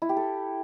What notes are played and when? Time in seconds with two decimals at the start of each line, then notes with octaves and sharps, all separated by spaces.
0.02 E4
0.09 G4
0.17 A4